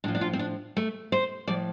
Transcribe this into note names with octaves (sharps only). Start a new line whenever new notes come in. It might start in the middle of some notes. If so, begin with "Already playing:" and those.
A2 F3 D4
D4
F4
C4
D4
A3
C5
A2 F3 D5